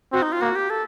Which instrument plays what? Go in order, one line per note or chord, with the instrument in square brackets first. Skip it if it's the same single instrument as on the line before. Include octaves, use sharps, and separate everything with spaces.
[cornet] C4 [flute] F#4
[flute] D#4
F4
[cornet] A#3 [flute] F#4
[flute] G4
A4